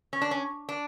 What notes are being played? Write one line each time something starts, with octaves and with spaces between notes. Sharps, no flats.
C#4
D4
C#4
D4